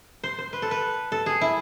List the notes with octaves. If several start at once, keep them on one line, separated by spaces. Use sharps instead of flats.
C5
C5
B4
A4
B4
A4
G#4
E4